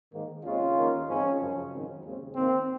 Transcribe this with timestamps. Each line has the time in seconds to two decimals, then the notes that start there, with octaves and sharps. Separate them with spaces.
0.12 G#2 D#3 A#3
0.43 D#2 C#3 G#3 C4 C#4 F4
0.76 D#2 D#3 A#3
1.08 G#2 F3 G#3 C4 C#4
1.39 F#2 C#3 F3
1.71 G#2 D#3 F#3 C4
2.03 D#2 C#3 G#3 C4
2.35 G#2 D#3 A#3 C4